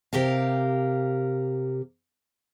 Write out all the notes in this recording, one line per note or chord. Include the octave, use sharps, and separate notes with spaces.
C3 G4 A#4 F5